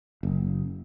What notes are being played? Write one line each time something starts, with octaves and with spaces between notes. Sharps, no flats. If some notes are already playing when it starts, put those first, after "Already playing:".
F#1